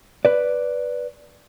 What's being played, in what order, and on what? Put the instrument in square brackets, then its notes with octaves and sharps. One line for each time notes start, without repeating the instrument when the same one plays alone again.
[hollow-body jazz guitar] B4 D5